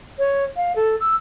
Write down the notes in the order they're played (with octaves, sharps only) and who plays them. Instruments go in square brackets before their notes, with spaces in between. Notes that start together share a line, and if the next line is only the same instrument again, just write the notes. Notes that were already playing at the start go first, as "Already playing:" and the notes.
[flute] C#5
F5
A4
E6